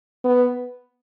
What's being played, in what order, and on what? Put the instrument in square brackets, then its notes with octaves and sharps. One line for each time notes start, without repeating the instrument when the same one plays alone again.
[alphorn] B3